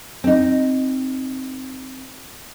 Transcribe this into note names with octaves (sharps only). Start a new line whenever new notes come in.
C4 D#4